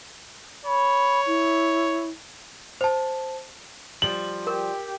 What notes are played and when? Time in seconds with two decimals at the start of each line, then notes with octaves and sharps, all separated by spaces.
0.65 C#5 B5
1.26 E4
2.81 C5 A5
4.02 F3 G3 F#7
4.47 G4 A#4